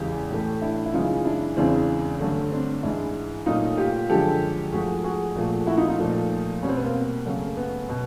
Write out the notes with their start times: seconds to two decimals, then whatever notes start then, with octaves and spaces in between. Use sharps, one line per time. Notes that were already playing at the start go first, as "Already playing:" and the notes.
Already playing: E2 C#3 E3 G#3 G4
0.30 A2 E3 A3
0.62 D4 E4
0.86 E4
0.93 F#2 C#3 E3 G#3 D#4 F4
1.25 D4 E4
1.57 E2 C#3 E3 G#3 C4 D4
2.20 G2 D3 F#3 A3
2.51 C4 D4
2.83 G#2 E3 G#3 D4 E4
3.46 A#2 F#3 A3 D#4 F4
3.77 F4 G4
4.09 F#2 D3 F3 G#3 G4 A4
4.72 G#2 F3 A3 F#4 G#4
5.04 F#4 G#4
5.36 A#2 F3 A3
5.67 E4 F#4
5.77 D#4 F4
5.88 D#4 F4
5.99 A#2 F3 A3
6.62 B2 G3 C#4
6.69 C4
6.77 B3
6.84 A#3 C4
7.25 F#2 C#3 F#3 A3
7.57 B3
7.89 B2